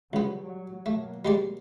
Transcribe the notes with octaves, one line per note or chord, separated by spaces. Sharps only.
C#2 F#3 G3 B3
F#3
B2 F#3 A3 A#3
G3 G#3 D5